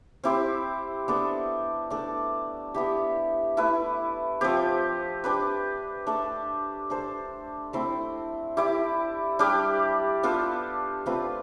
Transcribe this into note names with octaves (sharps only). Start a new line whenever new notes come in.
C4 E4 G4 C5
B3 D4 A4 D5
A3 D4 A4 D5
B3 E4 G4
A3 E4 B4
F3 C4 G4
D4 G4 B4
A3 D4 A4
D4 A4 C5
A3 C4 E4
E4 G4 D5
G3 D4 G4 D5
B3 D4 F4 A4
A3 C4 F4 B4